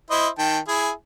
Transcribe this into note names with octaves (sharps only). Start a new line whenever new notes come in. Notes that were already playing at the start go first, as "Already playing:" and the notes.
E4 C5 D#5
D#3 G5 A5
E4 G#4 G#5